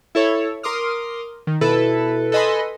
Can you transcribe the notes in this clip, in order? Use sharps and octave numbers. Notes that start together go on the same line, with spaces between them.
E4 A4 C#5
A#4 C6 D6 D#6 F6
D#3
B2 E4 A4 B4
A4 B4 D#5 G#5 B5 C6